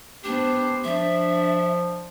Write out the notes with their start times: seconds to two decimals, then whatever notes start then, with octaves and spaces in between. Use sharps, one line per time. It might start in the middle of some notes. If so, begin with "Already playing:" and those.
0.24 B3 D4 G4 C5
0.84 F3 D4 E5